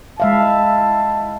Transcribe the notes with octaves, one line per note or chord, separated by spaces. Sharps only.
G#3 E4 E5 F5 A5